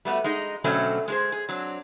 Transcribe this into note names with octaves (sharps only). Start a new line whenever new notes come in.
G3 A3 B3 F#4
G#3 D#4
B2 D3 F#3 A3 C4 C#4
G#3 G#4 C5
G#4
F#3 C4 D4